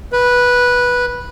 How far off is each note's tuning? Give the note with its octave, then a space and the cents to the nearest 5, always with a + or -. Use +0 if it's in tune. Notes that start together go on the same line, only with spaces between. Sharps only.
B4 -10